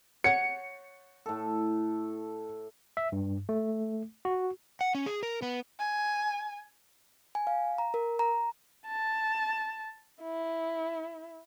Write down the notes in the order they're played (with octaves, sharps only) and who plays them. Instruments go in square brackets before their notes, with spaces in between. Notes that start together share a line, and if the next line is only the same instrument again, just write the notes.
[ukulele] C#5 F#5 [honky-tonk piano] C#7
[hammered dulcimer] A2 A4
[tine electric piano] E5
G2
A3
F#4
[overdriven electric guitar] F#5
C#4
G#4
A#4
B3
[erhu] G#5
[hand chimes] G#5
F5
A#5
A#4
A#5
[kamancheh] A5
E4